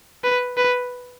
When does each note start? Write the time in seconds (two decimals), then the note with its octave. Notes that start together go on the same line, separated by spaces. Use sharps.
0.24 B4
0.57 B4